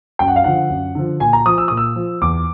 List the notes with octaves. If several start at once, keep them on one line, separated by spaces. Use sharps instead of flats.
F#2 G5
F#5
F5
D3 F3 F#5
F#2
D3 F3
A#2 G#5
A#5
F3 D#6
E6
A#2 D#6
E6
F3
E2 D6